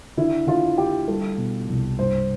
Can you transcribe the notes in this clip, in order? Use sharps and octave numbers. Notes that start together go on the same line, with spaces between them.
D3 E4
D3 F4
D3 G4
G3 A4
B2
C2
G2 C5